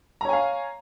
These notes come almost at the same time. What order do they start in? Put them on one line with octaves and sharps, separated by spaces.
A#5 C#5 G#5 F5